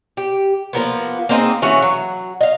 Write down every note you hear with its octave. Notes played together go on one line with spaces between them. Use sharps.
G4
F3 A#3 B3
A#3 C4 D#4 G#4
E3 C#4 F#4 F5
F#3
D#5 F5